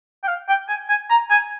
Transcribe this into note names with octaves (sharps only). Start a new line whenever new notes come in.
G5
F5
G5
G#5
G#5
A#5
G#5